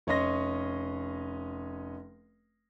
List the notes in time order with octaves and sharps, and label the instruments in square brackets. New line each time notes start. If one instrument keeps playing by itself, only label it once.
[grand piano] F1 C#4 C#5 D#5 C6 A#6